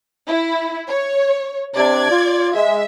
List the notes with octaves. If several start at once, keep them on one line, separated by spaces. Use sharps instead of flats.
E4
C#5
C3 D4 D5 G#6
F4
G#3 E5